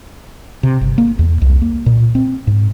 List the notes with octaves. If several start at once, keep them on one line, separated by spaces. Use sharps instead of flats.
C3
G1
A#3
E2
C2
A#3
A#2
C4
G#2